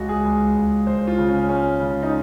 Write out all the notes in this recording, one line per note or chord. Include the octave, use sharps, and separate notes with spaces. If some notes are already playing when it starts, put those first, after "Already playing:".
Already playing: C#2 G#3 F#4
G#4
C#2
C#2
C#2 C5
F4
C#3
C#4
G#3 C#4
C#3
D#4